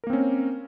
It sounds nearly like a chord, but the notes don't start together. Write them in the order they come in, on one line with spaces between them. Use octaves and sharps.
A#4 A#3 C4 C#4